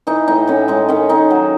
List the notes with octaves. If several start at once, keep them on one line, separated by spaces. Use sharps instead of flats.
E3 D#4
A2 D#4
A2 C#4
G#3 D#4
D#3 C#4
D#3 D#4
F#3